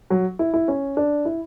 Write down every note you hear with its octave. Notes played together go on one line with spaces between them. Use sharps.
F#3
E4
E4
C#4
D4
E4